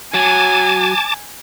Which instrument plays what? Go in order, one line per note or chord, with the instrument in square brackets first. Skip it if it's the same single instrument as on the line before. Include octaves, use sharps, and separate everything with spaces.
[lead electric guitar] F#3 [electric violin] G#5 [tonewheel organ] A5 D6